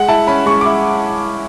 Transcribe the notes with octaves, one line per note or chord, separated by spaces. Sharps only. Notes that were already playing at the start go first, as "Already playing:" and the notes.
Already playing: G#3 F#5
E4 A5
C#4 B5
G#3 C#6
E4 D6